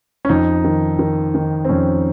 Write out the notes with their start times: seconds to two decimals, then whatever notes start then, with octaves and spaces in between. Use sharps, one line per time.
0.25 C#4
0.29 F2 D#4
0.65 D#3
0.99 D#3
1.35 D#3
1.65 C4
1.69 F2 C#4